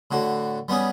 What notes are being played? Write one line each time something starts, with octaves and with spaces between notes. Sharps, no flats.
A2 D3 F#4
G3 B3 C#4 G#4